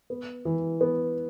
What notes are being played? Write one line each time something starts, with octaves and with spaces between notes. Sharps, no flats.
B3
E3
B3